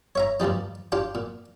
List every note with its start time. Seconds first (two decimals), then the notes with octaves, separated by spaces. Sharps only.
0.15 C#5 E5 A#5
0.40 D2 G2 F3 G3 D#4
0.92 D4 F4 G4
1.15 A#2